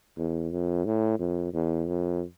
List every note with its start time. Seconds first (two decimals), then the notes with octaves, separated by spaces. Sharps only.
0.17 E2
0.51 F2
0.85 A2
1.19 F2
1.53 E2
1.87 F2